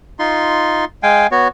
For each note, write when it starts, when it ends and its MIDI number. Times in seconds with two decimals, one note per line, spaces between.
0.19 0.85 63
0.19 0.85 65
0.19 0.85 84
1.03 1.27 56
1.03 1.27 77
1.03 1.27 79
1.03 1.27 80
1.31 1.48 59
1.31 1.48 66
1.31 1.48 73